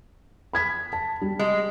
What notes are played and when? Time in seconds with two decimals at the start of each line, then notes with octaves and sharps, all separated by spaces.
0.53 B5 G#6 B6
0.93 A5
1.22 G3
1.39 G#3